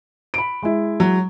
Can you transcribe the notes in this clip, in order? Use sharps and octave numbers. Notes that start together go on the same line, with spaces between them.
B5 D7
G#3 E4
F#3